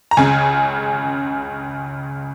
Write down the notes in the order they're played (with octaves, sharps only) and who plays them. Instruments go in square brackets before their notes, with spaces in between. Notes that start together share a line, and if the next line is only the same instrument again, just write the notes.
[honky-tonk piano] A#5
C#2 C#3 G#5